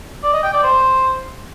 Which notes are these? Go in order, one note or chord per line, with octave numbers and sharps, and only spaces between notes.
D5
D#5
G5
D5
C5